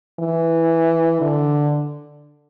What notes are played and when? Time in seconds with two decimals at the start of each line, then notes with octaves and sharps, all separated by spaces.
0.20 E3
1.21 D3